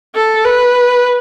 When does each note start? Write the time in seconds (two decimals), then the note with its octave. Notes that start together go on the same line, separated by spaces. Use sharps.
0.15 A4
0.45 B4